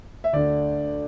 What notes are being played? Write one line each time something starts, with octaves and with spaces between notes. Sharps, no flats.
E5
D2 D3 D5